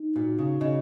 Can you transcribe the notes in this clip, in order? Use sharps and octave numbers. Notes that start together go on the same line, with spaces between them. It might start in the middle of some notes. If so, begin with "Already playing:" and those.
Already playing: D#4
A#2 F#4
C#3
C#3 D#5